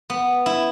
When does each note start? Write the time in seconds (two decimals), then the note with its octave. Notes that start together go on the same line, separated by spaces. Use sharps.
0.10 B3
0.46 E4